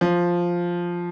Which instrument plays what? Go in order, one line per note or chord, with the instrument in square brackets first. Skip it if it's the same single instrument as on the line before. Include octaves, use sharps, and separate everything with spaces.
[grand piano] F3